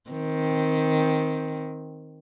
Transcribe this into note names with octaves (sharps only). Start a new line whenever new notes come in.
D#3 C4